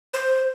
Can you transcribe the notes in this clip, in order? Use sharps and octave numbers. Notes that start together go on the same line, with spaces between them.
C5